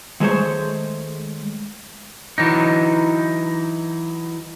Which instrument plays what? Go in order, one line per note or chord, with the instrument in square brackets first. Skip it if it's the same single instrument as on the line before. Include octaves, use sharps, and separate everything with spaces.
[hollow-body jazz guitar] D#3 G#3 A3 A4 C5 C#5
[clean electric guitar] E3 F#3 D#4